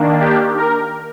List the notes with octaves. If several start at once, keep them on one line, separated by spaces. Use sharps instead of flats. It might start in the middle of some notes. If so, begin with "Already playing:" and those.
Already playing: D#3 A#3 D4
G4
A#4